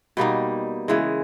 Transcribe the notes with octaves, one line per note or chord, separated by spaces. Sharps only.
B2 G3 A#3 D#4
C#3 E3 G#3